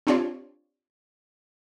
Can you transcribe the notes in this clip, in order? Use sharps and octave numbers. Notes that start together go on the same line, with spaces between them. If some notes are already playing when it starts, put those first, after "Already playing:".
C4 D4 F4 G4 C#5 D5